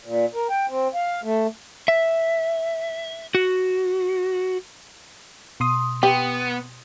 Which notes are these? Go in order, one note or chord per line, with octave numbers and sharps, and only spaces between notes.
A#2
A#4
G5
C4
F5
A3
E5
F#4
B2 C6 D#6
B3 G4